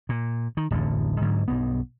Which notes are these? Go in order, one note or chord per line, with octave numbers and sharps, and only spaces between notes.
A#2
D#3
D1 A1 F2 D3
G#2 D3 F#3
B1 G2 B3